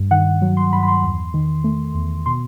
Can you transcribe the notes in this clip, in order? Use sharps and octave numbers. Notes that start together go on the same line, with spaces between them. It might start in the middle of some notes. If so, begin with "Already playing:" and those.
Already playing: G2
D#3 F#5
F#3
C6
G2 B5
B5
C6
E2
D#3
A3
E2
B2 C6